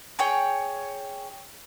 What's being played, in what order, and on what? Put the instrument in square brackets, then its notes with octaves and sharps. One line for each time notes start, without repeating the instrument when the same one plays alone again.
[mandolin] G#4 C#5 G5